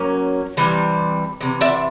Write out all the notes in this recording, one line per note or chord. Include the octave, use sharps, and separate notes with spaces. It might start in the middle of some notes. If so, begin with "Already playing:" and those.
Already playing: F#3 A#3 C#4
C3 E3 G3
C3 E3
D5 E5